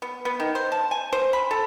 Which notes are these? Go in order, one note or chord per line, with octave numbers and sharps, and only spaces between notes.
B3
B3
D#3
C5
A5
G#5
C5
B5
A4